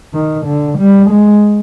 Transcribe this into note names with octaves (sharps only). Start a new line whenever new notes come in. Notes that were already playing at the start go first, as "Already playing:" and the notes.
D#3
D3
G3
G#3